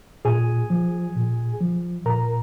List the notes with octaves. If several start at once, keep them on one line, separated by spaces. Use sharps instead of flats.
A#2 G#4 G#5
F3
A#2
F3
A#2 A#4 A#5